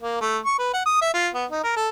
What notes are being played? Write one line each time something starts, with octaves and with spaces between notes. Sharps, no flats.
A#3
A3
C#6
B4
F#5
D#6
E5
F4
B3
D#4
A#4
A4